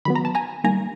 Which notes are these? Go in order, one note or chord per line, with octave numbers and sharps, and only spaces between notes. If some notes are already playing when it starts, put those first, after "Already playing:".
D#3 F#3 B3 B5
A#5
A5
G#5 A#5
D#3 G3 A#3 G#5 A#5